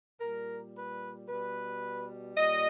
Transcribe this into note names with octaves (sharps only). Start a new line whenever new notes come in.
A#2 G3 A#4
B4
B2 G3 B4
A#2 G3 D#5